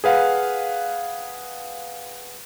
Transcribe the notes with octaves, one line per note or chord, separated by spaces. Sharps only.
G#4 B4 F5 F#5